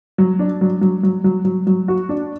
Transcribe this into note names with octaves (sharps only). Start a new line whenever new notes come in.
F#3
D4
F#3
F#3
F#3
F#3
F#3
F#3
F#4
D4